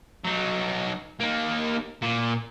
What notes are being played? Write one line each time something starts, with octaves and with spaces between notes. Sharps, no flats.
F#3 D#4
A#3 D#4
A#2